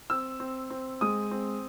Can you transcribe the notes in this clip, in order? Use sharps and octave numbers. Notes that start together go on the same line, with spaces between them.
C4 E6
C4
C4
G#3 D#6
C4